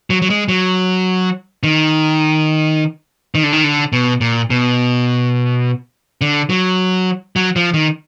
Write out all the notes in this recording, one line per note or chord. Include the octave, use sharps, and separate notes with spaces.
F#3
F#3
G#3
F#3
D#3
D#3
D3
D#3
D3
B2
A#2
B2
D3
F#3
F#3
F3
D#3